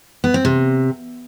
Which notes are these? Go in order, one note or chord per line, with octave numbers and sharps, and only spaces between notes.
B3
C4
C3